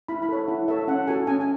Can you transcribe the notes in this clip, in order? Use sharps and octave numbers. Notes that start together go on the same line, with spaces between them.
E4 B5
B5
A4 C#5
E4 F#5
A4 C#5 E5
C#4 F#5
F#4 A4 G#5
C#4 G#5
G#5